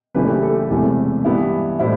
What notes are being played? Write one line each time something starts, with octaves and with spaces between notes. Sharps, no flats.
F#1 F#2 E3 A3 D4 G4 B4
G4
A4
G4
E1 E2 C3 E3 A3
G2 E3 B3 E4 G4
A2 G3 C4 E4